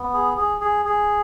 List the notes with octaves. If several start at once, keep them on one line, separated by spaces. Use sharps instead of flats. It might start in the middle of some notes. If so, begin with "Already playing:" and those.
Already playing: B3
G#4
G#4
G#4
G#4